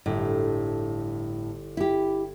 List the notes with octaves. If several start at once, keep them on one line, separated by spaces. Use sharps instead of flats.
G1 A2
E4 G4